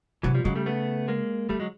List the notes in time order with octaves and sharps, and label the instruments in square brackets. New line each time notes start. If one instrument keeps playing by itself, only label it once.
[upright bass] C3 [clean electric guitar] E3 F#3
[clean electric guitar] F3 G3
[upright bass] C#3 [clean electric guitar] F#3 G#3
[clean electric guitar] G3 A3
A3 B3
G#3 A#3
[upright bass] D3 [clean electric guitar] G3 A3
[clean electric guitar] F#3 G#3